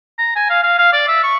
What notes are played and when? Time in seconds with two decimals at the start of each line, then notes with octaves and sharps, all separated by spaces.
0.18 A#5
0.36 G#5
0.50 F5
0.63 F5
0.79 F5
0.93 D5
1.08 E5
1.23 C#6